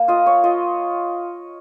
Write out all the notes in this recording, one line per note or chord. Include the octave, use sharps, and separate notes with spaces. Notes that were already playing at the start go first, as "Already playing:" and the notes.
Already playing: A#3
F4 D#5
C#5
F4 D#5